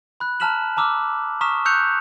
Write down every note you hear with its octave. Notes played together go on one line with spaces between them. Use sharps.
B5 F#6
A5 A#5 F6 B6 E7 F#7
A5 A#5 D6 E6 F6
A#5 C#6 D#6 F6 B6 E7
C#6 E6 F#6 G6 C#7 F7